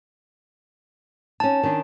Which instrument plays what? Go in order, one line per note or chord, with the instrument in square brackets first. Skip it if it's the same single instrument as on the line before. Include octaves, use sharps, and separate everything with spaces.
[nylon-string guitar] C#4 D#4 [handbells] A5
[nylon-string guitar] D#3 C#4 D4